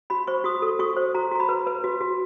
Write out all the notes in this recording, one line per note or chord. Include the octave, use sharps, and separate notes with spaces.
F#4 B5
C5 C#6
F#4 D#6
A4
F#4 C#6
C5
F#4 A#5
F#4 A#5
B5
B4
B4
F#4
F#4